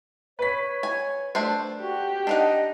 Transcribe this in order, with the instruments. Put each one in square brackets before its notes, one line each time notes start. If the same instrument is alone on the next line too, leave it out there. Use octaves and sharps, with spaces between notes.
[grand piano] B4 B6 [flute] C#5
[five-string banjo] G#5
A3 D4 C5
[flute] F#4 [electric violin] G4
[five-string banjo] D4 D#4 F#5 [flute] D#5